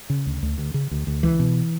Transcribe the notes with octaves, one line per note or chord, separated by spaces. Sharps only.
C#3
D2
D2
D2
C#3
D2
D2
C#2 E3
B2